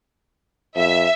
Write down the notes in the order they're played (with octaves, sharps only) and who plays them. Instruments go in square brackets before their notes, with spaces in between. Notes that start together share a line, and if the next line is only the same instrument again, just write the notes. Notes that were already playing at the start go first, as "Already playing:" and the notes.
[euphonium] F2 [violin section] E5